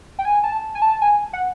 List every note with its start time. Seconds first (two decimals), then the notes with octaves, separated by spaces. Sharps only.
0.19 G5
0.25 G#5
0.44 A5
0.75 G#5
0.82 A5
1.02 G#5
1.33 F#5